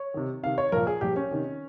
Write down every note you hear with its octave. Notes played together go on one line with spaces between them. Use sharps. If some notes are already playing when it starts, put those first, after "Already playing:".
Already playing: C#5
C3 D#3
C3 D#3 F5
C#5
A#2 F3 A#4
G#4
A#2 F3 G4
C#4
C3 D#3